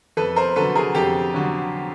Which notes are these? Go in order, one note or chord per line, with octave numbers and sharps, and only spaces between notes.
F2 A4 B4
A#4 C5
D3 F#3 A4 B4
G#4 A#4
F2 G4 A4
D3 F#3